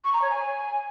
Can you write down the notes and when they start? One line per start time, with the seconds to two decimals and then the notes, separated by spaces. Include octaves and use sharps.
0.04 C#6
0.13 A#5
0.21 C#5
0.30 G#5